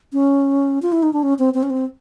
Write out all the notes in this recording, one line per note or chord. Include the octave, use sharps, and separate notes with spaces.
C#4
F4
E4
D#4
D4
C#4
C4
C4
C#4
C4